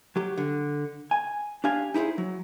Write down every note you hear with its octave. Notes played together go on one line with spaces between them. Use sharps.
F#3 G4
D3
G#5
D4 G4 F5 G#5
D#4 E4 G4 G#4 C5
F#3